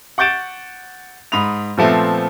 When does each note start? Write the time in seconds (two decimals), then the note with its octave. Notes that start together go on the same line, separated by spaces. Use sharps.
0.18 F#5 C#6 G6 A6 D7 E7
1.32 G#2 B5 D#6 F7
1.77 A#2 F3 A3 B3 C4